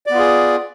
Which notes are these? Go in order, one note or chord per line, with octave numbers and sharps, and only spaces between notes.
B3 F4 G#4 D5